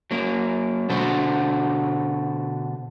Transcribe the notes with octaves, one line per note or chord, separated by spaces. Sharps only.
F#3 A#3
B2 D3 F#4 C5